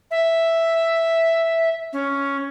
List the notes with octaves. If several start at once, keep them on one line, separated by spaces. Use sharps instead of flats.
E5
C#4